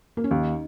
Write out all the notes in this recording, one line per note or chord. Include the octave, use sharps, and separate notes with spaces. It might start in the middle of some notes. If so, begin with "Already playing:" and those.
A#3
C#4
D#2 D#4